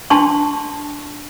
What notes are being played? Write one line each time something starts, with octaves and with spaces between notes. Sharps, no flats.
D4 A5 C6 C#6